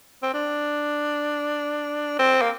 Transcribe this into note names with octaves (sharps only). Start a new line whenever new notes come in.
C4
D4
C4
A#3